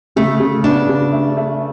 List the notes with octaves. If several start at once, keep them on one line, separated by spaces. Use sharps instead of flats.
C#3 A3
C#3
B3 D4
C#3
A3
A3